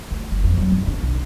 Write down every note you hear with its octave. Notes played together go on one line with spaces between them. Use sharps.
D2
G1
F2
F#3
G#1
D4
B1